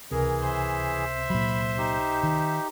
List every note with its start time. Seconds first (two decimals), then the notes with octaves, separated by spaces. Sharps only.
0.11 C#2 C3 E3 G#4 A#4
0.47 C5 E5
1.30 A#2 F#3 B5
1.78 D#4 G4
2.23 D#3